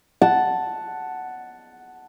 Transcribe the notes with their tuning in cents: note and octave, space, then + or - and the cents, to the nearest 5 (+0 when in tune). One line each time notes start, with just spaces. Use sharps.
F#5 +5 A5 +0